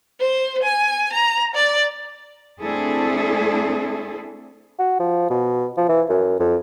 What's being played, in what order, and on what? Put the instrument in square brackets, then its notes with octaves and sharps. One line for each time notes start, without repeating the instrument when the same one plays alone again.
[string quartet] C5
G#5
A#5
D5
[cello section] A3 C4 D4 E4 G#4 A4
[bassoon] F#4
F3
B2
F3
E3
F#2
F2